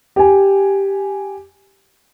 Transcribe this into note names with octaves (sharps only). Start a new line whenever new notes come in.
G4 G#5